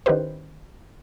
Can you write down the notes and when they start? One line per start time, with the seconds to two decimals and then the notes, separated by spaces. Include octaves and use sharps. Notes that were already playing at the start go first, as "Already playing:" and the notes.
0.06 D#3 C#4 E4 G4 B4 C5